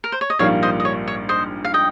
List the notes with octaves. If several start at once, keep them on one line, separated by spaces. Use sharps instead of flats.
A#4
C5
C#5
D#5
A#1 G#2 G3 A#3 F4 C#5 F5
C5 D#5
D#5
C#5
C#5
C5 D#5
F5
D#5 G5